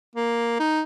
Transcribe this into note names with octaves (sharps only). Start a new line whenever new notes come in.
A#3
D#4